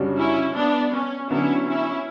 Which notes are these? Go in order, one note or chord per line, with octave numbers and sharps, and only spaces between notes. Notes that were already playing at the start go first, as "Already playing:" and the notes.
Already playing: F#2 C#3 G3 D4 F#4
C#4 E4
B3 D4
C#4
D3 F#3 B3 C#4 D4 E4
C#4 E4